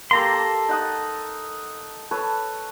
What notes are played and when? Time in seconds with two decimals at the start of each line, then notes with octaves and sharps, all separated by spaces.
0.11 A#3 G4 A4 A#5 C6
0.33 A5
0.69 D#4 F#5 D#6
2.11 A4 B4 C#5